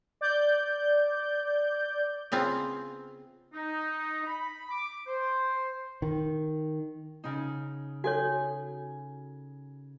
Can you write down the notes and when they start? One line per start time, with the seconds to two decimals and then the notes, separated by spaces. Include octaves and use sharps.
0.21 D5 G6
2.32 C#3 B3 C4 F4
3.54 D#4
4.27 B5
4.70 D6
5.08 C5
6.02 D#3
7.24 C#3 D#4
8.04 F#4 A4 C#5 G#5